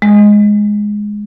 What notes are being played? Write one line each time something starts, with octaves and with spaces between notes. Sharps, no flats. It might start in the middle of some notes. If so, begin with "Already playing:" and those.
G#3